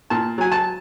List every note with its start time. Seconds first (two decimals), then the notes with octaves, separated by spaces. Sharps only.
0.10 A#2 A5
0.38 F#3 G#5
0.52 A5